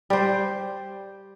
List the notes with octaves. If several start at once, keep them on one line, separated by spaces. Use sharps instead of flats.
G3 C5